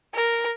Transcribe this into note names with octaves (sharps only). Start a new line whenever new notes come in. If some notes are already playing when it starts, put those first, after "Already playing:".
A#4